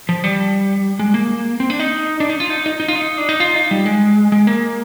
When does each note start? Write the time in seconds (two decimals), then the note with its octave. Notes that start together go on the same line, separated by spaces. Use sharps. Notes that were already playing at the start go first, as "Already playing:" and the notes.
0.09 F3
0.24 G3
0.99 G#3
1.14 A#3
1.60 C4
1.70 D4
1.80 D#4
2.20 D4
2.30 D#4
2.40 F4
2.50 D#4
2.66 D#4
2.80 D#4
2.88 F4
2.95 D#4
3.18 D4
3.29 D#4
3.40 F4
3.55 D#4
3.71 G3
3.86 G#3
4.32 G#3
4.47 A#3